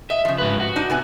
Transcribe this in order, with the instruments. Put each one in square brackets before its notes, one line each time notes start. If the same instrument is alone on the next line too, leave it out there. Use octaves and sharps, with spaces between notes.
[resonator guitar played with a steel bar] D#5 [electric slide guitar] E5
[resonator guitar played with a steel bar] C#3 F3
[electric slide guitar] G#2 B4
F#4
[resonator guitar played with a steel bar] D4 D#4
C3 B3 G#5